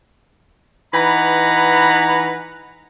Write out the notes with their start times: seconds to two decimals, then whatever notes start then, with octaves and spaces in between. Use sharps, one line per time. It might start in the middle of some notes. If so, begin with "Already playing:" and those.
0.93 E3 D#4 B4 F#5 A#5 B5